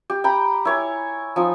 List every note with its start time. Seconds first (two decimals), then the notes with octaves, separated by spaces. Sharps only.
0.10 G4
0.24 G5 A#5 B5
0.65 E4 C#5 G#5
1.36 F3 D#4 G#5